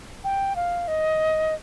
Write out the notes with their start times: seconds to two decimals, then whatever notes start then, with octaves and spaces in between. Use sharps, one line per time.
0.24 G5
0.56 F5
0.88 D#5